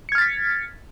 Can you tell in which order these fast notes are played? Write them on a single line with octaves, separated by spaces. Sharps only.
C#7 G#6 F6 A6 B6